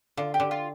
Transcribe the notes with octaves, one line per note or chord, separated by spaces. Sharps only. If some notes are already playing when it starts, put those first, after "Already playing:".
D3 F4
G4
D3
F4